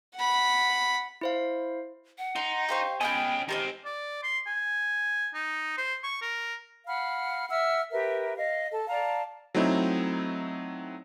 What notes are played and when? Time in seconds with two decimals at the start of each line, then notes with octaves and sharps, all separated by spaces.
0.15 F#5 B5
1.21 E4 C5 F5
2.18 F#5
2.36 D#4 C6
2.69 G4 C5 F5 C#6
3.01 B3 C#4 F4 G4 D#5 G5 G#5
3.49 D#3 C4 G4 A#4 C5 D#5
3.85 D5
4.23 C6
4.47 G#5
5.34 D#4
5.78 C5
6.04 C#6
6.22 A#4
6.86 F5 F#5 B5 F6
7.49 E5 F#5 E6 F6
7.92 G4 A#4 B4 E5
8.37 D#5 F5
8.72 A4 A5
8.88 D5 F5 A5 A#5
9.55 F#3 A3 C4 D#4 E4